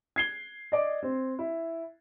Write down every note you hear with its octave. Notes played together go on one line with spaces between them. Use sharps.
G#6 C7 G7
D5 D#5
C4
E4